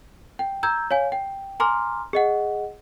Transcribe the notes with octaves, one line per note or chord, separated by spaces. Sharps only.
G5
A#5 E6 G6 G#6
C#5 F5 G#5
G5
G#5 A#5 C6 D6 F6
G#4 D#5 F#5